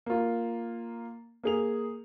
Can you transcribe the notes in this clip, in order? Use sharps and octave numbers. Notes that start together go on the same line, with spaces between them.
A#3 F4
A#3 G#4 F7